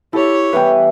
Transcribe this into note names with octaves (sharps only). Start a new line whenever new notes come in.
E4 G4 A4 C#5 A5 B5
E3 G3 B3 B4 G5